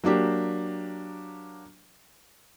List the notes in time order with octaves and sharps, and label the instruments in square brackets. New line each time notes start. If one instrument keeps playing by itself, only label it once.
[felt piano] F#3 A#3 D4 G4